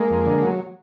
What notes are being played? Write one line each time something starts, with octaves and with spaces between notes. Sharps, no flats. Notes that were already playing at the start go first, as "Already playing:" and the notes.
Already playing: G#3 A#3
F2
D3
F#3